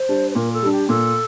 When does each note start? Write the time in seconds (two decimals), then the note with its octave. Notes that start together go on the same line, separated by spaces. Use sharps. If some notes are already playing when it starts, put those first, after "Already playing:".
Already playing: C5
0.09 G3 D4
0.31 C5
0.35 A#2 A#4
0.53 A4
0.62 G3 D4
0.72 G4
0.89 A#2 A4